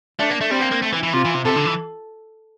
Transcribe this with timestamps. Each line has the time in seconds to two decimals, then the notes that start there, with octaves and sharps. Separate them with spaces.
0.19 A3 D4
0.30 A#3
0.41 A3
0.51 G3 C4
0.61 A#3
0.71 A#3
0.82 A3
0.93 E3
1.03 E3
1.13 C3 F4
1.25 E3
1.34 C3
1.45 C3 A4
1.56 D3
1.66 E3